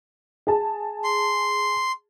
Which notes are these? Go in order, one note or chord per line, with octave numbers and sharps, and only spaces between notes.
G#4 A5
C6